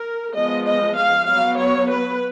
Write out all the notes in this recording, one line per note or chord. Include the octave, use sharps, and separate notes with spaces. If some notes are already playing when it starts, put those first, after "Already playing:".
Already playing: A#4
F3 G#3 B3 D#5
D#5
F5
F#3 B3 F5
C#5
B4